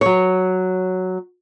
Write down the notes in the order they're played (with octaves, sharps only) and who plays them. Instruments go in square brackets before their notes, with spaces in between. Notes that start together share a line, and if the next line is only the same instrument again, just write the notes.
[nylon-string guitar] F#3 C#5